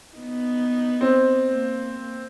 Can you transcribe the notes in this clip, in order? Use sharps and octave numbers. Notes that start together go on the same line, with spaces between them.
B3 D#4
C4
A#3